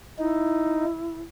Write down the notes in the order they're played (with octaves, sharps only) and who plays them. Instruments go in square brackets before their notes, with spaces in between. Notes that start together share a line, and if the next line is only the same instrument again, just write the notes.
[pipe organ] D#4 [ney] E4